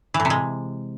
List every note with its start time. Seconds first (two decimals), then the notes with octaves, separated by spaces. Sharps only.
0.14 E3
0.20 A2
0.25 C3
0.30 G#3